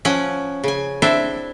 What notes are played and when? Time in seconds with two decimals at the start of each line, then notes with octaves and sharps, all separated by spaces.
0.05 F3 C#4 F#5
0.64 C#3 G#5
1.02 C4 D4 E4 C5 E5